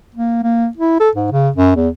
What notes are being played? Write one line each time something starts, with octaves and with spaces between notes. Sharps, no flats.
A#3
A#3
E4
A4
G#2
C#3
F#2
E2